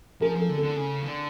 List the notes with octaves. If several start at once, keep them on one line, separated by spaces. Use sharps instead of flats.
F3 G#4 A#4
F3 A4
D3
A4
D3
C#3
D3